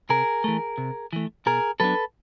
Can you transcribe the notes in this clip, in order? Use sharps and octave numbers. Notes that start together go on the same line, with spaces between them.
C3 G#4 A#4
E3 A3
C3
E3 A3
B2 G#4 A#4
F#3 B3 D4 A4 B4